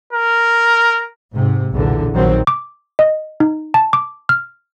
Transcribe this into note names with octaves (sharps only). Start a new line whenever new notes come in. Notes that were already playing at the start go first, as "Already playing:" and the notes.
A#4
G#2 C3
B1 E2 A#2 D3
A#1 D#3 F#3 C4
D6
D#5
D#4
A5
D6
F6